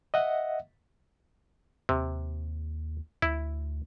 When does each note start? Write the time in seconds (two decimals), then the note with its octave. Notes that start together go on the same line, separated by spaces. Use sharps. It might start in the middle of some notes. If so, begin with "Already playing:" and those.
0.14 D#5 E5 F#5
1.89 D#2 C3
3.22 D2 E4